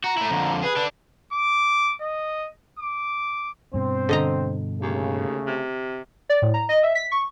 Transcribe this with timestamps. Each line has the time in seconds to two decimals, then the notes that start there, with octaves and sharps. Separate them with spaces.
0.04 F#4 A#5
0.17 A3 E4
0.30 F2 D3
0.63 G#4 B4
0.77 D4 A4
1.33 D6
2.01 D#5
2.79 D6
3.74 G2 B2 C4 C5
4.09 D3 D#5 A#5
4.81 D#2 C#3 A3
5.47 C3
6.29 D5
6.42 A2
6.54 A#5
6.69 D#5
6.83 E5
6.95 B6
7.12 C#6